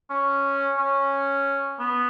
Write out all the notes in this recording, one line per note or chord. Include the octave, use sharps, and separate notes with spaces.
C#4
C#4
B3